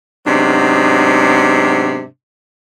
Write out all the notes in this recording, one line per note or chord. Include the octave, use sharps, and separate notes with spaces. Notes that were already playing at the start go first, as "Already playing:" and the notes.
G#2 C3 F#3 G#3 B3 D4